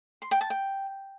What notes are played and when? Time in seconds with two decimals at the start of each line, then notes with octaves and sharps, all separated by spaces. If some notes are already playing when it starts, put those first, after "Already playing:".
0.22 C6
0.31 G5
0.41 A5
0.50 G5